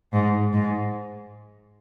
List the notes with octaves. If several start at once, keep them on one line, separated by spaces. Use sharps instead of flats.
G#2
G#2